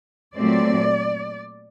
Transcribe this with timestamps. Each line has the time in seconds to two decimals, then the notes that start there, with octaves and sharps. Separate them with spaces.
0.35 A#2 F#3 A3 C4 D5